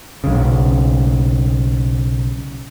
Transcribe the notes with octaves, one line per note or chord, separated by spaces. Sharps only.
B1 C#3